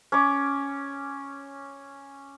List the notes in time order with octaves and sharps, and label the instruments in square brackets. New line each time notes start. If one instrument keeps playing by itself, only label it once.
[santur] C#4 D6